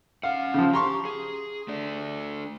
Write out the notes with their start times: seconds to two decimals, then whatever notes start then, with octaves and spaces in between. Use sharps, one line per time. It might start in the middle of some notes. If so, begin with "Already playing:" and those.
0.23 C#4 F5 F#5
0.54 C#3 F3
0.73 G4 A#5 C6 C#6
1.05 G#4
1.68 A3 D4